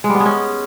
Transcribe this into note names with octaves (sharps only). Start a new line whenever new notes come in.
G#3
G3
B3
G#3
C#4